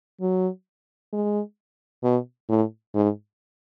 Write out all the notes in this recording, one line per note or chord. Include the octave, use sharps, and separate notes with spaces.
F#3
G#3
B2
A2
G#2